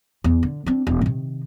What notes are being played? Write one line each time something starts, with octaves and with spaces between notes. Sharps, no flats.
E2
D3
C4 D4
E1
C3 D#3